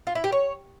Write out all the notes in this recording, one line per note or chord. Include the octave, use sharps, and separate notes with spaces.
F4
E4
G4
C#5